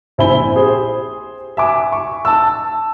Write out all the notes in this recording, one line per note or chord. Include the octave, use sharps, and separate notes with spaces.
A#1 C4 E4 G#5 B5 G7
G4 G#4 C5
E5 G#5 D6
C#6
A5 E6